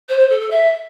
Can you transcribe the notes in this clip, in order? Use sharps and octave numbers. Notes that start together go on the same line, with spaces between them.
C5
C5
A4
A4
E5